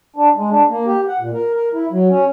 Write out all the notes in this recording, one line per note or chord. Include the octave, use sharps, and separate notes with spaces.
D4
G#3
D4
A#3
G4
F#5
A#2
A#4
A#4
E4
F#3
C#4